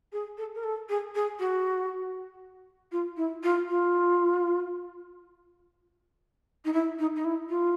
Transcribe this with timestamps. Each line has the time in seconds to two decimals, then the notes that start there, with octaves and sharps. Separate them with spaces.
0.12 G#4
0.38 A4
0.55 A#4
0.63 A4
0.89 G#4
1.15 G#4
1.39 F#4
2.92 F4
3.17 E4
3.43 F4
3.69 F4
6.65 D#4
6.73 E4
6.99 D#4
7.16 D#4
7.24 E4
7.49 F4